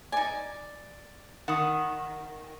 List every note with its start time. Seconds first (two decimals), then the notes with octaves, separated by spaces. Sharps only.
0.12 D#4 D5 G#5
1.48 D#3 F#5 B5 D#6